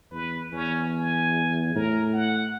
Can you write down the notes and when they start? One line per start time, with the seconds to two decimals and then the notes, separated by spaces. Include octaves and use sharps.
0.11 E2 B4
0.52 E2 C#4
0.95 G#5
1.76 A2 A#4
2.13 F#5